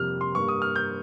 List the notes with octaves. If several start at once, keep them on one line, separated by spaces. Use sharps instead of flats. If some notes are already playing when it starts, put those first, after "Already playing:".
Already playing: F2 C3 G3 A#3 F6
C6
G2 G3 A#3 C#6
D#6
F6
G6